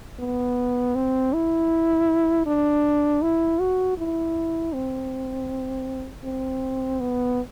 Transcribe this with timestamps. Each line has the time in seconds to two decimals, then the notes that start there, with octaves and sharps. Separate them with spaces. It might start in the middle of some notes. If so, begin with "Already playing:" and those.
0.20 B3
0.96 C4
1.33 E4
2.46 D4
3.22 E4
3.60 F#4
3.98 E4
4.74 C4
6.24 C4
7.01 B3